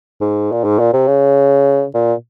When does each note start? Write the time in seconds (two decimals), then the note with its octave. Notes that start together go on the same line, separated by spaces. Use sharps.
0.21 G#2
0.52 A#2
0.64 G#2
0.79 A#2
0.93 C3
1.07 C#3
1.94 A#2